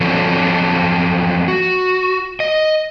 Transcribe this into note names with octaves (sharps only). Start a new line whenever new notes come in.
F3 F#3 C4 D4 A4 C#5
F#4
D#5